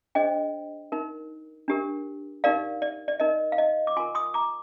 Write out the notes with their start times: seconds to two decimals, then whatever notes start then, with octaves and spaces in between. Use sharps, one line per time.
0.15 D4 G#4 C5 D#5 G5
0.92 D#4 A#4
1.68 D4 G4 A#4
2.44 D#4 G4 A#4 D5 F5
2.82 D5
3.08 D5
3.20 D#4 A#4 D#5
3.52 F5
3.58 D#5
3.87 D6
3.97 F4 A#4 G#5 C6
4.15 C6 D#6
4.34 A#5 D6